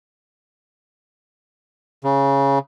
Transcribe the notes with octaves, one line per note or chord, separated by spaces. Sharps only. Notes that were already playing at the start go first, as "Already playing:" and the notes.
C#3